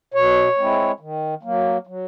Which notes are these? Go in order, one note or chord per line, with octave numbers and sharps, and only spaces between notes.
B2 C#5
G#3 C4 E4
D#3
F#3 A#3
F#3